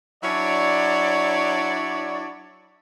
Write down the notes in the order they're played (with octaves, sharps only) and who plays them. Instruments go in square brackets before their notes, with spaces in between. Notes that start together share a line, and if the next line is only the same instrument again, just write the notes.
[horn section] F#3 D4 E4 C#5 D5